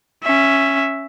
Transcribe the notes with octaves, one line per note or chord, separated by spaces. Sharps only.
C#4 E5